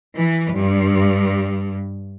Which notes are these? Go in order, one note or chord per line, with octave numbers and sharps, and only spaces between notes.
E3
G2